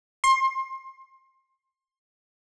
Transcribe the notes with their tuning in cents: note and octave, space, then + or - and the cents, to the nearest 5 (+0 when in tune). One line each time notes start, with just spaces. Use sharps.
C6 +25